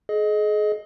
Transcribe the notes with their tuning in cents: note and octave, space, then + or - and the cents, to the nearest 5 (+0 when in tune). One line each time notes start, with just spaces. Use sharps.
G#4 +35 D#5 +0